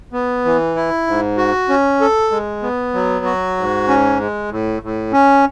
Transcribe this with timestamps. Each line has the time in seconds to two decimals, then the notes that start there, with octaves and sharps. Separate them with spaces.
0.13 B3
0.45 E3
0.76 E4
1.07 G#2
1.38 F#4
1.69 C#4
2.01 A4
2.31 G#3
2.63 B3
2.94 F#3
3.25 F#4
3.57 G#2
3.88 C#4
4.20 G#3
4.51 A2
4.82 A2
5.13 C#4